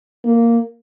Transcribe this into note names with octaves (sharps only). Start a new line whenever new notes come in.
A#3